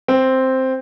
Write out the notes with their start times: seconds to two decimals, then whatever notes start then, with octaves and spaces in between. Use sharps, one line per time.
0.08 C4